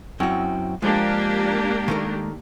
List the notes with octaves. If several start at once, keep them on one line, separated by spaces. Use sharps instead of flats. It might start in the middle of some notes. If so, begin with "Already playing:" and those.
F#2 C4 E4 F#4 G5
F3 G#3 A#3 D4 G4
D#3 A3 A#4